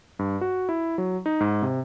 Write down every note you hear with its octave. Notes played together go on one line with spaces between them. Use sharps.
G2
F#4
E4
F#3
D#4
G#2
C3